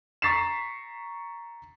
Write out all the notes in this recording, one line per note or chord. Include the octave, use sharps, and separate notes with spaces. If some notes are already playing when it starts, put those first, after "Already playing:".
A#5 C#6 A6 B6 C7 E7